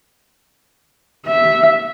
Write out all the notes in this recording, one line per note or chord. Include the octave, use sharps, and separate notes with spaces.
E5